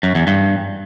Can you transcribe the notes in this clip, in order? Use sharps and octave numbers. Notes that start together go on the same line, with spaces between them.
F#2
E2
G2